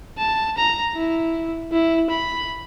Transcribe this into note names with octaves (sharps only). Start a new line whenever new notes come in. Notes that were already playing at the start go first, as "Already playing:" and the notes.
A5
A#5
E4
E4
B5